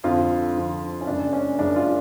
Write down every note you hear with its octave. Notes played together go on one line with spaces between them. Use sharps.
F2 D3 F3 F4
F2 D3 F3
C#4
F#1 F#2 C#3 G#3 D4
C#4
F#1 F#2 C#3 G#3 D4
F4